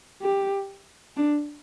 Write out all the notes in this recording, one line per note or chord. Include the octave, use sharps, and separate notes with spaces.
G4
D4